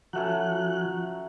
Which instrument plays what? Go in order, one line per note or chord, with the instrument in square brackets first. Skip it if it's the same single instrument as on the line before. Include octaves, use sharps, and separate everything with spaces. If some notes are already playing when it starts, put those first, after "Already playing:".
[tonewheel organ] F3 F#6 [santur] F#3 A3 C#4